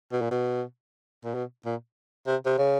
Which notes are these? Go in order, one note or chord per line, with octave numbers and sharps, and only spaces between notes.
B2
A#2
B2
A#2
B2
A#2
C3
C3
C#3